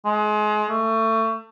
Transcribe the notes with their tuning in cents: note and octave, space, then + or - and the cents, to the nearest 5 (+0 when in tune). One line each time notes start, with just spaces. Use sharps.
G#3 +30
A3 +25